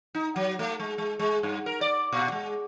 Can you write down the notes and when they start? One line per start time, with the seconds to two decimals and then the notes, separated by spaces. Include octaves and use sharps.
0.15 D#4
0.36 F#3
0.59 A3
0.80 G#3
0.98 G#3
1.19 G#3
1.43 G2
1.66 A#4
1.81 D5
2.13 A#2
2.32 G#3